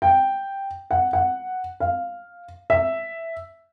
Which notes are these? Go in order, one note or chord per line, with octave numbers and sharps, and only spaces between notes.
G5
F#5
F#5
F5
E5